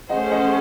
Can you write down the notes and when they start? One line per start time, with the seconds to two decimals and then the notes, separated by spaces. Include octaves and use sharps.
0.09 A3 C#4 G#4 C5 D#5 F#5
0.31 D#5 F#5